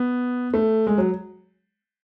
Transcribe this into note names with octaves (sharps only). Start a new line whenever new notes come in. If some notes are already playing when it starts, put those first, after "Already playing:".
Already playing: B3
A3
G#3
F#3